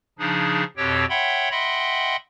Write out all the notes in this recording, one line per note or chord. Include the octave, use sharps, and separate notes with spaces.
C#3 F3 D4 D#4 G#4
F2 B2 C4 G4 C#5 G5
C#5 E5 F#5 G5 B5 C6
D#5 E5 F#5 G5 B5 C6